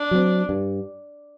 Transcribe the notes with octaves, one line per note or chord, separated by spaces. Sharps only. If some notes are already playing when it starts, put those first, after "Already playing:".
Already playing: D4
F#3 C4
G2